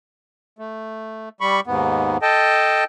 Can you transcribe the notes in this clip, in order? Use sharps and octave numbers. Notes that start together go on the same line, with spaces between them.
A3
G3 B5 C#6
D#2 G#2 B3
A4 D#5 G5 A5